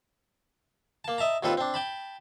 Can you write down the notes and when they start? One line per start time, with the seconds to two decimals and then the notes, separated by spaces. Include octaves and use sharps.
1.04 A#3 A5
1.18 D#5 E5 A5 A#5
1.43 D#2 A#2 C4 F4 A4 B4
1.57 C4 D4
1.74 G5 A5 B5